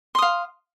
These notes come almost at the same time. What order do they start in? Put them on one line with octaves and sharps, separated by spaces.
C6 D#6 F5